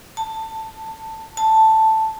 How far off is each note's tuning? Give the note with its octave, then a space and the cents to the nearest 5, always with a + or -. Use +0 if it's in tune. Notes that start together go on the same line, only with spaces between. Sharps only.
A5 +15
A5 +5